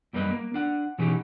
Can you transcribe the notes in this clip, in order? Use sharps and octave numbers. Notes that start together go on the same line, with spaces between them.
F#2 G3 A#3 B4 D#5
A#3
D4 F#5
B2 E3 C#4 D#4 G4